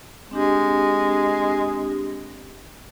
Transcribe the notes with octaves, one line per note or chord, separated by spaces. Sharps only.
G#3 C4 D4 G4